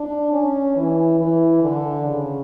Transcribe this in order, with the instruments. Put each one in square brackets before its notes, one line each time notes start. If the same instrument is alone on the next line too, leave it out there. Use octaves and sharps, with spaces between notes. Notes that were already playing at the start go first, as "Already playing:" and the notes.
Already playing: [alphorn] D4
C#4
E3
E3
D3
C#3